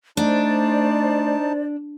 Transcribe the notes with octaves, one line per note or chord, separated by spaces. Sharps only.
A3 D4 D#4 C5 D5 A5